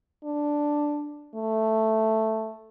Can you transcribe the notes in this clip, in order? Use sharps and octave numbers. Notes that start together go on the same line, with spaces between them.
D4
A3